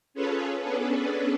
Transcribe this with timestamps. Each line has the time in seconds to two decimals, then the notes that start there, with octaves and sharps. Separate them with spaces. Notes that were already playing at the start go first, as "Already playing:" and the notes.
0.14 C#4 F4 G#4 A4 B4 C#5
0.60 B3 C#4 D4 G#4 A4 B4